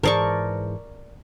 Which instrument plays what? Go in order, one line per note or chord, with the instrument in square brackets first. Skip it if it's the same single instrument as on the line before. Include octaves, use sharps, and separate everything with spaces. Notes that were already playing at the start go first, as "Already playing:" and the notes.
[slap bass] G#2 E3 [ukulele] G#4 C5 A5 [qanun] A#4 D5 C#6